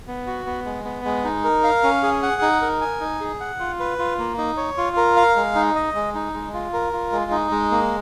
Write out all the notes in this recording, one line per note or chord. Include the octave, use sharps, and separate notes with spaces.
B3
F#4
B3
G#3
B3
G#3
D#4
A#4
F5
C#4
G#4
F#5
D#4
A#4
G#5
D#4
G#4
F#5
F4
B4
F4
A#3
D#4
C#5
F4
A#4
F5
G#3
D#4
D#5
G#3
D#4
G#3
F4
A#4
F4
G#3
D#4
G#3
A#3